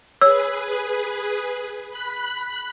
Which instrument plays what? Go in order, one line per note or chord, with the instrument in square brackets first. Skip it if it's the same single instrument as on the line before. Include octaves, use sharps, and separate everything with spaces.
[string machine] G#4 B4 [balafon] C#5 [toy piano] E6
[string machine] B5 F#6